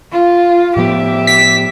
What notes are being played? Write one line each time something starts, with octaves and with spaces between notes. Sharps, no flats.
F4
A2 F3 B3 G4 E5
B6